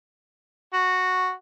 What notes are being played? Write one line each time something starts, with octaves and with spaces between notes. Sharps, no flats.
F#4